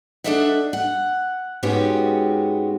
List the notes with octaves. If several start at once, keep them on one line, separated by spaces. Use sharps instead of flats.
D4 F4 A4 D#5 E5 F#5
F#5
G#2 G#3 B3 C#4 F#4 G4